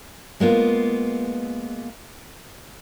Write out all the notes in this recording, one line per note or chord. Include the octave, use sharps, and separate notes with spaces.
G#3 A#3 B3 F4